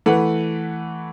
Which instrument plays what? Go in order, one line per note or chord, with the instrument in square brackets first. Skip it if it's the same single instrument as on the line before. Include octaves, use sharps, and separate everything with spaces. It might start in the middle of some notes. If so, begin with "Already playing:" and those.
[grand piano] E3 A3 B4 F#5